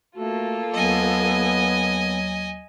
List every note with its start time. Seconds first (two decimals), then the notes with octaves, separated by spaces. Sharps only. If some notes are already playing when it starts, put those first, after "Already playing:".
0.16 A3 A#3 F4 F#4 A4
0.74 D#2 F#3 B3 D#5 G#5